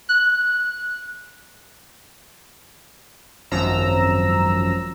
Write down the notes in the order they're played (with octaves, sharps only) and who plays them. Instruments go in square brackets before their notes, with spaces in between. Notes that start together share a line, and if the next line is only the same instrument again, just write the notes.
[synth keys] F#6
[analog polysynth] G#1 F#2 F3 A#5 E6